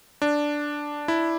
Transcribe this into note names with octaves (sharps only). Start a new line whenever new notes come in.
D4
E4